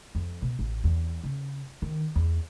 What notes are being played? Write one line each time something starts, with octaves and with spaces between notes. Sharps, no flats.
F2
B2
A1
E2
C#3
D#3
E2